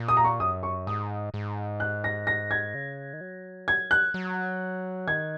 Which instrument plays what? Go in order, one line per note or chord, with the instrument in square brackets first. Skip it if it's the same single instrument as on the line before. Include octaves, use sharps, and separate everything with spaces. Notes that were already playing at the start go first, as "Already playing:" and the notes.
Already playing: [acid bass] A#2
[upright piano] D#6
A#5
C#6
[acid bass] F#2 [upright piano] D#6
[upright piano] C#6
[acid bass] G#2 [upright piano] D#6
[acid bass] G#2
[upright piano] F#6
A#6
A#6
G#6
[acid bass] C#3
D#3
F#3
[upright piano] G#6
F#6
[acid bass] F#3
[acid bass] D#3 [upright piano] G#6